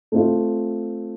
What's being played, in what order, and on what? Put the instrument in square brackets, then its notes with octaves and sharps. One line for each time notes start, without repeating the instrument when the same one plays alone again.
[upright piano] A3 C4 F4